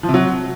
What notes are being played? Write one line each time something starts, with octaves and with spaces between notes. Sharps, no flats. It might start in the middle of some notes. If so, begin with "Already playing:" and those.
F3
C3
F#3